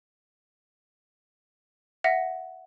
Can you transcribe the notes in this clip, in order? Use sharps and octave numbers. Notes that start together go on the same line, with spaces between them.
E5 F#5 A#6